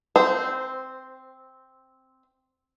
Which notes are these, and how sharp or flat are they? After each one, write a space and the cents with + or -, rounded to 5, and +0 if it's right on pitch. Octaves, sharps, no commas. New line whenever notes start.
C4 +0 C5 -20